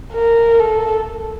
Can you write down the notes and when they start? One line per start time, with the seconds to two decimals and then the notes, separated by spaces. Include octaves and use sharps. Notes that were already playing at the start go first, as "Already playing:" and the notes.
0.13 A#4
0.60 A4